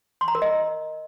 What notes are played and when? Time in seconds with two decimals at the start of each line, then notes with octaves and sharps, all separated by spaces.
0.21 C6
0.28 A#5
0.35 A#4
0.42 D#5